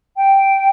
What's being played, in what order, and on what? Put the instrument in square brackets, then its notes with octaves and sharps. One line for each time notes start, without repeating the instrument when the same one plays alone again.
[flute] G5